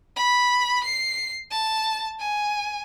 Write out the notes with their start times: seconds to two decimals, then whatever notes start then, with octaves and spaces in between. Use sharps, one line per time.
0.16 B5
0.84 C7
1.51 A5
2.20 G#5